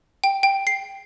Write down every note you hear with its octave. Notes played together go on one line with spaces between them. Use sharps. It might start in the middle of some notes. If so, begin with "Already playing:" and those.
G5
G5
C7